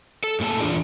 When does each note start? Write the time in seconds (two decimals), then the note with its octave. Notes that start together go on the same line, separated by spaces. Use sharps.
0.24 A4
0.40 A2 A#3 G#4 A4 A5
0.61 E2 E3 D4 F4 G#4 D5